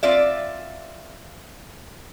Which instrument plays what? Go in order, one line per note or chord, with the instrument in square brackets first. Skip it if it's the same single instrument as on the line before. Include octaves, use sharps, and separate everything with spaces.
[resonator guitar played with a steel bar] C4 F4 D5 E5